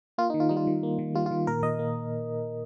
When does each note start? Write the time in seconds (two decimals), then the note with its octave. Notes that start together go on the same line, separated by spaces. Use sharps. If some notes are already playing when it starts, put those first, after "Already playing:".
0.18 A#3 F4
0.30 D#3 D#4
0.40 F4
0.49 G3 D#4
0.57 F4
0.67 D#3
0.83 A#3
0.99 D#3
1.15 G3 F4
1.26 F4
1.31 D#3
1.47 A#2 A#4
1.63 A#2 D#5
1.79 A#3